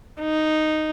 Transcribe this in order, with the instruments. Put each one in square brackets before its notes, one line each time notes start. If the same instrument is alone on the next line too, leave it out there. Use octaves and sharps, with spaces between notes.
[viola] D#4